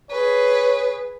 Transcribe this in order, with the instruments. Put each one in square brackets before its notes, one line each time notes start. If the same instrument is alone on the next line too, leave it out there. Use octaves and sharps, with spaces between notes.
[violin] G#4 B4 [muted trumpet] C#5